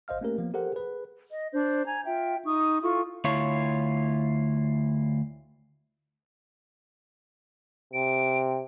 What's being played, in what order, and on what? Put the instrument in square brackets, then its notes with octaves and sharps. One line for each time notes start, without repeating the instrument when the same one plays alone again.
[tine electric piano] G#1 C5 D#5 F5 F6
A3 A#3 C#4 G4 A#4
F3 A#3 B3
G4 A4 A#4 C5 F#5
G#4 B4
[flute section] D#5
D4 C5
G#5 A#5 G#6
F4 E5 G5
D#4 C#6 D#6
E4 F4 A4 C#6
[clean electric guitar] D2 E4 F4 C#5
[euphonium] C3 [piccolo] D7